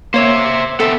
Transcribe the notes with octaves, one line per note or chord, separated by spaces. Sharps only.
A#3 C5 C#5 E5
B3 C4 A4 E5